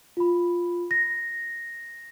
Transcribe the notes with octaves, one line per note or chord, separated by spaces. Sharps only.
F4 B5
A#6